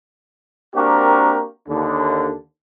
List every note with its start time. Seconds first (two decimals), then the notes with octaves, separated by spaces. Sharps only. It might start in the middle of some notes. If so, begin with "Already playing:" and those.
0.75 A#3 C4 D4 F#4 G4 A#4
1.68 D#2 D3